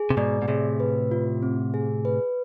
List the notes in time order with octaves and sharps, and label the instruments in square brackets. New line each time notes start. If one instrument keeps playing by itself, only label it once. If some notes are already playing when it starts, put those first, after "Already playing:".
Already playing: [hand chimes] G#4
[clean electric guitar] C3
[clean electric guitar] G#2 B2 [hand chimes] D5
[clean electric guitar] B2
[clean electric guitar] A2 C3 [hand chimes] G#4
[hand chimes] B4
F4
C4
G#4
B4